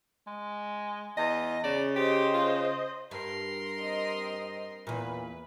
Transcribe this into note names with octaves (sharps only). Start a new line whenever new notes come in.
G#3
E2 D#5
C#3 D5
G4 C5 D#5
F4
G2 A#4 C6
C4 D#5
E2 A#2 B4